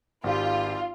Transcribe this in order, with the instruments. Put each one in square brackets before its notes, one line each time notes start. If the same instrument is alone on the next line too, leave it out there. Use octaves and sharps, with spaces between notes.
[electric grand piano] G#1 G4 [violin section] F4